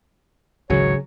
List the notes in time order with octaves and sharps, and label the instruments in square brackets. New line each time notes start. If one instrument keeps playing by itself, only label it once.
[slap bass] G#1 C#2 [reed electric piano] C#3 G#4 [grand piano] F#3 [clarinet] C#5